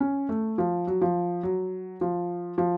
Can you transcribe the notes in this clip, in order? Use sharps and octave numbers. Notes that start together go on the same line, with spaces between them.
C#4
A3
F3
F#3
F3
F#3
F3
F3